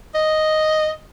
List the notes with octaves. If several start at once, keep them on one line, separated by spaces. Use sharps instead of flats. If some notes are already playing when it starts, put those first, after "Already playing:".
D#5